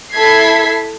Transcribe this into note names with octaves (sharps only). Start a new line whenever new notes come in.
E4 A4 G#6 B6 C7